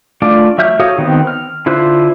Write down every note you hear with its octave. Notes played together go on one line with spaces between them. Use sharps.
A3 D4 F4 D5
F#3 E5 F6 G6
F#4 A4 C#5 F5 D#6
D#3 B3 C4
F6
D3 E4 F4 C5 F#6